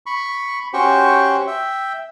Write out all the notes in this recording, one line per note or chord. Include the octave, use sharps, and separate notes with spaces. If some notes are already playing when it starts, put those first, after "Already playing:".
B5 C#6
C#4 F#4 G4 C5 G5 C#6
E5 G5